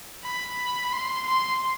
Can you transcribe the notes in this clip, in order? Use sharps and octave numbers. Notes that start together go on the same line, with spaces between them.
B5
C6
C6